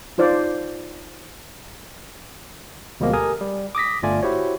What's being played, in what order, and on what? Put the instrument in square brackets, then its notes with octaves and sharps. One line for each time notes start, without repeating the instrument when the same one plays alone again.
[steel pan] D#4 F4 C5 D5
[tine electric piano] D2 B2 F3 G#3 A#3
G4 A4 A#4 G#5 D#6
G3
D6 D#6 A#6 B6
G1 A3 F4 D5 G#5
E4 F#4 G4 C5 C#5